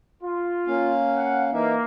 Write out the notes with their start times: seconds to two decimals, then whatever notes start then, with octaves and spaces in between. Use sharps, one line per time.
0.23 F4
0.67 A#3 C#4 F5
1.14 F#5
1.53 E3 A#3 D#4 E5